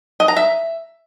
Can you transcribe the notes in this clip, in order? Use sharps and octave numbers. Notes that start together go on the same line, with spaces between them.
D#5
A#5
E5